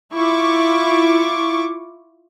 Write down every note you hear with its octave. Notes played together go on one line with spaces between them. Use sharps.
E4 F4 C#6 D6